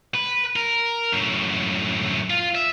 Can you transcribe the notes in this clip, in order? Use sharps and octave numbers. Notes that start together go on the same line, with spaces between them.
B4
A#4
F#2 A2
F4
E5